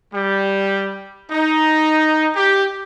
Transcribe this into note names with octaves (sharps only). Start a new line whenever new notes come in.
G3
D#4
G4